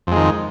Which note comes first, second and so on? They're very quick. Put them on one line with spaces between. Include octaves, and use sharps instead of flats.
F2 G#3 D#3